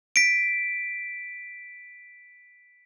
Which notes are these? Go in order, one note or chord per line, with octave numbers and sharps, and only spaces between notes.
B6 D7